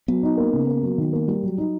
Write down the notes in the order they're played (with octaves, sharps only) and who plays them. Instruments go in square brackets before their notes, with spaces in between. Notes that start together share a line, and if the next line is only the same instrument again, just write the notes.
[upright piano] F#3 [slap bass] B3
[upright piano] D#4
A#3
C#3
A#3
F#3
D#3
A#3
G3
F#3
D#4